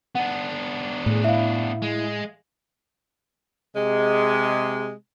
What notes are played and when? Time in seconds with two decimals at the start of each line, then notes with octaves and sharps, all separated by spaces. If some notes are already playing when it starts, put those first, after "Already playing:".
0.15 B3 D4 F#5
1.06 A2 G#4
1.24 E4 E5 F5
1.82 G#3
3.74 C3 G#3